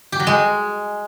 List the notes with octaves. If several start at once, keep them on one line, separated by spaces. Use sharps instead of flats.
G4
F#3
G#3